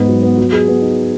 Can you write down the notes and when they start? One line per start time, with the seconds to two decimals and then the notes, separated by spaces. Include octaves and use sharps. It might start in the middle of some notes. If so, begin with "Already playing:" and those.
Already playing: G#2 B3 D#4
0.08 F#3
0.23 B3
0.37 F#3
0.53 G#4
0.68 B3
0.82 D#4